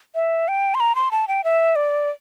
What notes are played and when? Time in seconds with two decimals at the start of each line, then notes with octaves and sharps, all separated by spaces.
0.15 E5
0.48 G5
0.75 C6
0.80 A#5
0.95 C6
1.11 A5
1.28 G5
1.44 E5
1.76 D5